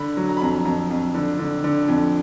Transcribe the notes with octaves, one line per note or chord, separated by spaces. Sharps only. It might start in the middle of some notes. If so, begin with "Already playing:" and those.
Already playing: D3 B5
F#3
A#5
B5
F2 A#5
F2 A#5
F2
D3
D3
D3
F2